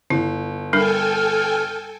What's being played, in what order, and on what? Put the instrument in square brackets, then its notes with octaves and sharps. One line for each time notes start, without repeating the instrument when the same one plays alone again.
[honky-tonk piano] G1 [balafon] E4
[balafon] G3 D4 A#4 [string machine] A4 G5 G#5 [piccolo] F6